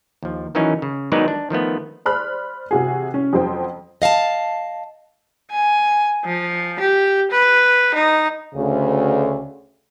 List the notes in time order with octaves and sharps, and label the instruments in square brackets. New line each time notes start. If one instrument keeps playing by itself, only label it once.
[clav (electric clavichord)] D#2 F3
D#3 E3 F#3 C#4 D#4
C#3
D#3 F#3 G#3 B3 D#4 D5
D4
D#3 F3 A3 B3
[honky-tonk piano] C5 D5 B5 F6 F#6
C3 F#4 G#4
C#4
F2 F#3 C5 G5
[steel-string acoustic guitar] D#5 F5 G#5 A5
[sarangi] G#5
F3
G4
B4
D#4
[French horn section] D2 [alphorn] C#3